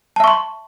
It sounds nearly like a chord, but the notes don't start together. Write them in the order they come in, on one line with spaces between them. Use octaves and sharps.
A5 E5 C#6 C6